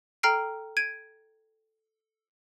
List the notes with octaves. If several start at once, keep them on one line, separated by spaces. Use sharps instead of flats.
A4 G5 A#5 F6 C7 D7
G#6 D7 D#7